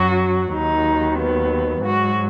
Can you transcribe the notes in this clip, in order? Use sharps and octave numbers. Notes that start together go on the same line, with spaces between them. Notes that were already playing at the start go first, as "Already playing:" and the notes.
Already playing: F#2 F#3 F#4
D#2 D#3 F#3 D#4
B3
G#2 F#3 F#4